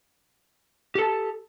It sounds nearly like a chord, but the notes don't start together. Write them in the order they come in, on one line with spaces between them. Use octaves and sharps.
G4 A4 A5